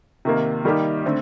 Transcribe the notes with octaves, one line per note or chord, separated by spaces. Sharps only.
C3 D#3 A#3
D#3 G3 A#3 D#4 G4
D3 A3 C4